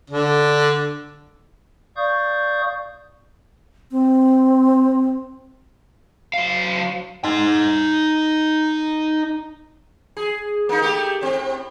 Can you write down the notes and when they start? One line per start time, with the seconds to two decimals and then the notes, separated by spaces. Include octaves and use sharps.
0.10 D3 D4
1.97 D5 F5 C#6 D#6 G6
3.91 C4
6.34 F#3 F5
7.24 D#4 C6
10.17 G#4
10.69 A#3 D#4
10.82 A3 G4
11.21 A2 C4